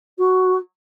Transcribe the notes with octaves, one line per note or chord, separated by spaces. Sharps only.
F#4